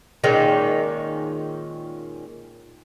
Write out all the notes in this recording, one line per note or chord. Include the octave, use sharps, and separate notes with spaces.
A#2 D#3 G#3 C#4